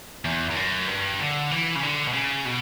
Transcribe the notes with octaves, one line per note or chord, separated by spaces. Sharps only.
E2
E2
F#2
G2
D3
E3
C#3
D3
B2
C#3
B2